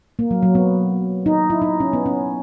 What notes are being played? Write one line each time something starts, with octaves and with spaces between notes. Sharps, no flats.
A#3
F#3
F#3
B3
D#4
E4
D#4
C#4
B3
C#4